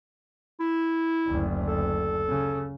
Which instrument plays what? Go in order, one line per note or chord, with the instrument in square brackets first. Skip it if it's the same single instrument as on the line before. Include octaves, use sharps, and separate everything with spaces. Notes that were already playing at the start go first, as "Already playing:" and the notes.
[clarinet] E4
[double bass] F#1 D2
[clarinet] A4
[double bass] C#3